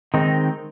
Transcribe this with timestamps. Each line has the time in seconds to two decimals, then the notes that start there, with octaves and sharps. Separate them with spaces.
0.14 D#3 G#3 C4 D#4